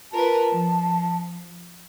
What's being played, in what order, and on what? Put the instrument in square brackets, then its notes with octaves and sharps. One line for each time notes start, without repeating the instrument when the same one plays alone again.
[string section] F4 A#4 B4 [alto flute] A5
[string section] F3